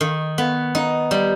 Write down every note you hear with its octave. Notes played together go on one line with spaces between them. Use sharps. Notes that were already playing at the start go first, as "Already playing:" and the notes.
D#3
B3
D#4
G3